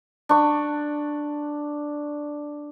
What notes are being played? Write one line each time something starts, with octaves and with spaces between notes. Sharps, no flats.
D4 C#6